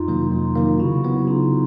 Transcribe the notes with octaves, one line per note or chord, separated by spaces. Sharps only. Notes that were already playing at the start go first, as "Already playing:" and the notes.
Already playing: F2 D#4 F4
C3 D#3 F#3 A#3
F2 D#4 F4
C3 D#3 F#3 A#3
C#3 E4 F#4
F#3 B3
C#3 D#4 F4